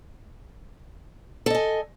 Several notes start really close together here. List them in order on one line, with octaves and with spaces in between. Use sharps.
A4 D#5 G#5